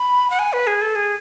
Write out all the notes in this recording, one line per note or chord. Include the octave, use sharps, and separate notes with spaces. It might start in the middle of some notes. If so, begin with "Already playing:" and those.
Already playing: B5
F#5
G#5
B4
G#4
A4
G#4